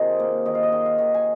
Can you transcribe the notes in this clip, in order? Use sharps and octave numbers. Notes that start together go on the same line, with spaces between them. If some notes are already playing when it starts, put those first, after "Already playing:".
Already playing: C3 D#3 D#4 F4 G#4
A#3
D#3 D#5
F5
D#5
D#3
F5
D#3
G#5